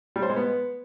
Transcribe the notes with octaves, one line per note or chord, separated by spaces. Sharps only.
G3
C5
G#3
B3